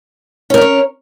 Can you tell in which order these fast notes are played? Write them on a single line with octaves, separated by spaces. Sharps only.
C#4 A#4 D5 C#5